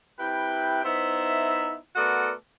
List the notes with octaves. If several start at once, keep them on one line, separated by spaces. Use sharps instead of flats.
C3 E4 B4 G5
B3 D#4 E4 C5 E5
A3 B3 F#4 A4 A#4 D5